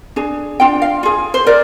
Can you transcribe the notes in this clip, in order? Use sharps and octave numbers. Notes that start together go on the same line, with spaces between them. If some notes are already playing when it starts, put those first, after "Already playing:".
D4 G#4
D4 F4 G5
F5
F4 G#4
C5
A#4 D5